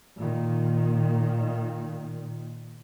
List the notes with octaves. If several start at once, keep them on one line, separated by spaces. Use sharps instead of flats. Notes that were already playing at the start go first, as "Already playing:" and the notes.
A#2 D#3